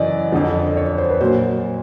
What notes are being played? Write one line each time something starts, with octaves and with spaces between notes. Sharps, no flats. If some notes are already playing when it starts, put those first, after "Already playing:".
Already playing: F#2 C#3 E3 D5 D#5
F2 D3 F3
C#5
C5
B4
A#2 F#3 C5